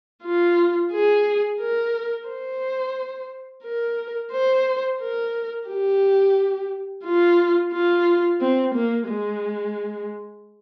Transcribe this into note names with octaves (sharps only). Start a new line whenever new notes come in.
F4
G#4
A#4
C5
A#4
C5
A#4
G4
F4
F4
C4
A#3
G#3